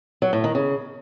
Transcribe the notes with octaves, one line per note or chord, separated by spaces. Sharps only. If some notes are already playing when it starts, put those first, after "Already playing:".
F#3
A2
D#3
C#3